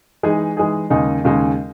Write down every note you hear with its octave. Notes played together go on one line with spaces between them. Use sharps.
E3 G#3 D#4 G#4
E3 G#3 D#4 G#4
D#2 C#3 G#3 D#4
D#2 C#3 G#3 D#4